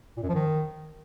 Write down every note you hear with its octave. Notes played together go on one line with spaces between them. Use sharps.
A#2
F#2
F3
D#3